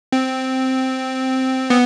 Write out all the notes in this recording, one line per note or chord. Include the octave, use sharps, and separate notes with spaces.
C4
B3